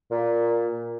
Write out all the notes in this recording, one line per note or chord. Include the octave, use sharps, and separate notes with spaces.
A#2